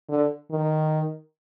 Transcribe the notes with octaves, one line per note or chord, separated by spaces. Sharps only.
D3
D#3